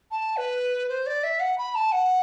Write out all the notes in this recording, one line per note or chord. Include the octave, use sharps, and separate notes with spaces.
A5
B4
C5
D5
E5
F#5
B5
A5
F#5